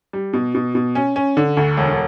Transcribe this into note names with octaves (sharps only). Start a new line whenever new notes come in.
G3
B2
B2
B2
C#4
C#4
D3
D2
E1